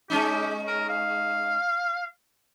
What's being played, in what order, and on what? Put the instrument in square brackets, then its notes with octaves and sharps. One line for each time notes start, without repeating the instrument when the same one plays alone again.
[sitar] G#3 C#4 D#4 [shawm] G4
[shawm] A#4
F5